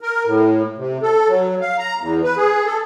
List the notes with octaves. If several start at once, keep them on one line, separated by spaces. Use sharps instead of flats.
A#4
A2
C3
A4
F#3
F5
A#5
E2
B4
G#4
A4